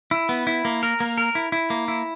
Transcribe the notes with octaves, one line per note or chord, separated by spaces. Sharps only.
E4
B3
E4
A#3
A#4
A#3
A#4
E4
E4
A#3
E4